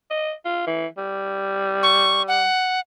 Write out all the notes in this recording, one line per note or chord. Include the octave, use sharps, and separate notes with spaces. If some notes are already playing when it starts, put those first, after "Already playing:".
D#5
F4
E3
G3
C#6
F#5